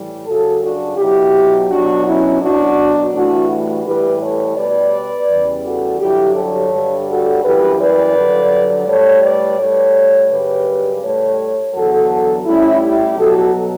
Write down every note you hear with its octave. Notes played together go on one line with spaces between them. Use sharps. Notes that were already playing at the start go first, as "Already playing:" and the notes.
Already playing: A2 E3 G3
F#2 C#3 F#3 F#4 A4
D4 F#4
B2 F#3 E4 G4
B2 F#3 D4 F#4
C#4 E4
B2 F#3 D4 F#4
A2 E3 G3 D4 F#4
A2 E3 G3 G4 B4
A4 C#5
B2 G3 B4 D5
E2 C#3 E3 G3
F#4 A4
G2 D3 F#3 E4 G4
A4 C#5
G2 D3 G3
F#4 A4
F#2 E3 G3 G4 B4
B4 D5
G2 D3 F#3
A2 G3 A4 C#5
B4 D5
A2 G3 A4 C#5
F#2 C#3 G3 G4 B4
A2 G3 A4 C#5
E2 D3 F#3 F#4 A4
A2 G3 C#4 E4
E4 G4
B2 F#3 F#4 A4